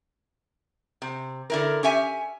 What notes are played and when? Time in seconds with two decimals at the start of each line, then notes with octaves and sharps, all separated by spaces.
1.02 C3
1.50 D3 E4 A#4
1.83 C#4 G4 E5 G#5